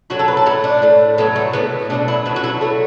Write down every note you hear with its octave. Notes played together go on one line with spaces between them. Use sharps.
A2 F#3 A3 F#4
A4
B4
A4
A2 A3 E4
D4
A2 A3
A2 F#3 A3 B3
A3
A2 F#3 A3 B3
B2 F#3 A3 D4
E4
B2 F#3 A3 F#4
F#4
E4
D3 F#3 A3 B3